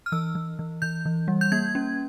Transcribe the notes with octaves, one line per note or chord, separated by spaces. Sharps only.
F6
E3 E6
E3
E3
E3 G6
E3
G3
G6
A#3 G#6
C#4